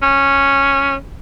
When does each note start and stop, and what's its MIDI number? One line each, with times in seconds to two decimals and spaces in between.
0.03 0.95 61